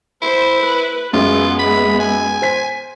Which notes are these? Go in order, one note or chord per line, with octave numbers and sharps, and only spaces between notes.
E4 C5
B4
F#2 G#3 B3 F4
B5
G#5
C5 B6